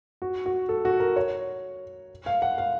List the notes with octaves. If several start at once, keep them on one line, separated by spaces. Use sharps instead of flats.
F#4
F#4
A4
F#4
A#4
C#5
F5
F#5
F5